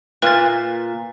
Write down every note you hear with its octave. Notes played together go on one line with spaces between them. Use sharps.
A#2 B4 A6